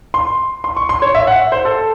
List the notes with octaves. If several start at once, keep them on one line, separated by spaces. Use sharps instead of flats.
C6
C6
C#6
C6
C#5
E5
F#5
C5
A4